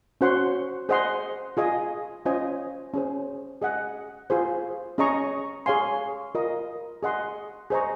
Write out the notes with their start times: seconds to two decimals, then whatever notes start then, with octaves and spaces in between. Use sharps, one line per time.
0.21 C#4 F#4 C5 F#5 C6
0.89 G#4 C5 D#5 F#5 C6
1.57 F4 G#4 D#5 G#5
2.25 C#4 F4 C5 D#5 G#5
2.94 C#4 G#4 C5
3.62 G#4 D#5 F#5
4.30 F4 G#4 C5
4.98 C#4 G#4 D#5 A#5 C#6
5.66 G#4 C#5 F5 G#5 C6
6.35 F4 A#4 D#5
7.03 G#4 D#5 F#5 C6
7.70 G#4 C5 D#5 A#5 C#6